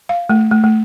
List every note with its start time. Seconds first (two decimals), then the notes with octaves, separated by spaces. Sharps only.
0.09 F5
0.30 A3
0.51 A3
0.64 A3